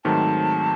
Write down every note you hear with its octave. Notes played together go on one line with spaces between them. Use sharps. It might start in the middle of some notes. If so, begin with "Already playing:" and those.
G#2 D#3 F#3 A3 C4 A5